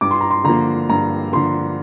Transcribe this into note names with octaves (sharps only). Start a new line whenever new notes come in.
G2 D6
C6
A#5
C6
D3 F3 A#3 A#5
G2 A#5
D3 F3 A#3 C6